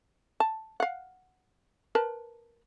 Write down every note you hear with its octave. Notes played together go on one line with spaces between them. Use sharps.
A5
F5 F#5
A#4 B4 A5